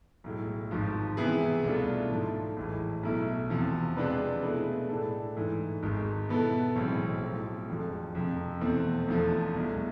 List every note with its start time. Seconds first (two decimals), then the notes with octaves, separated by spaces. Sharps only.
0.24 B1 A2 G#3
0.71 G#1 G#2 F3
1.17 C3 E3 B3 E4 G#4
1.64 C2 B2 A3 D4 F4
2.10 G#2 F3 A3 E4 A4
2.57 A1 A2 E3 G#3
3.03 B1 B2 A3 E4
3.50 E2 C3 F3
3.97 C3 G#3 D4 F4 B4
4.42 B2 A3 E4 G#4 B4
4.89 A2 G#3 D4 A4
5.36 G#2 E3 A3
5.83 G#1 G#2 G#3
6.29 B2 B3 E4 A4
6.75 B1 A2 E3 G#3 C4
7.22 B1 A2 F3
7.68 F1 F2 D3 F3 G#3
8.15 F2 C3 F3
8.61 E2 B2 A3 C4
9.07 F1 E2 D3 F3 A3
9.54 C2 B2 G#3